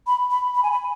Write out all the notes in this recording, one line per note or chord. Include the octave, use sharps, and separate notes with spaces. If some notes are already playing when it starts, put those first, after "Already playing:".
B5
B5
B5
G#5
B5